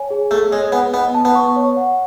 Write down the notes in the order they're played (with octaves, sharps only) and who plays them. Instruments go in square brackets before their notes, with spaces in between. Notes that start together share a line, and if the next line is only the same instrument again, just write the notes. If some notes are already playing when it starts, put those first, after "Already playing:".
Already playing: [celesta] C#5 G#5
G#4
[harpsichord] A3 [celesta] G#4
[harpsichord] G#3 [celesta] C#5
[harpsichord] B3 [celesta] G#5
[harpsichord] B3 [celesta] D#5
[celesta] A5
[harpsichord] B3
[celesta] C#6
C#5
F#5